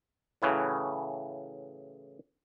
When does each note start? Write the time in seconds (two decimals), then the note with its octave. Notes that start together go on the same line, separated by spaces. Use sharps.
0.42 A2 C#3 E3 F#3